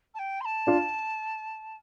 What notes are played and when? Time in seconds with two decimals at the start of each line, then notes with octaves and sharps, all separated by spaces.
0.14 A5
0.19 G5
0.40 C6
0.45 A5
0.67 D4 F4